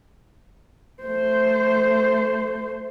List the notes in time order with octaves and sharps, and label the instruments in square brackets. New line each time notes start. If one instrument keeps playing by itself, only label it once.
[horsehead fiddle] A3 C5